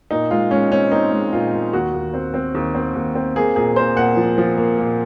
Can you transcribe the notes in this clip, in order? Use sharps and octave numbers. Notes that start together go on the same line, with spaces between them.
A#2 D#4
G#3 F4
G#3 C#4
C4 C#4
C4 D#4
G#3
A#2 F4
A#2
D#2 F#4
D#2
C4
C4
D#2
C4
D#2
C4
A#3 G#4
A#2 G#4
A#3 C5
A#2 F#5
F3
F3
A#3
A#2